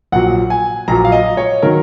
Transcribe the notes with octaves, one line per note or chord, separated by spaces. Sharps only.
A#1 A#2 F#3 F#5
G#5
A#1 A#2 F#3 A#5
F5
D#5
C#5
D#3 F#3 A#4